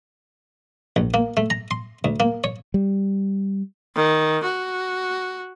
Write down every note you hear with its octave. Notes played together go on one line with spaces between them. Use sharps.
A#1
A#3
A3
A#5
C6
D2
A#3
C#5
G3
D#3
F#4